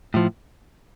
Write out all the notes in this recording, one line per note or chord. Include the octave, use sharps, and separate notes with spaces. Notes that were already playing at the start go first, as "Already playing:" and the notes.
A2 F3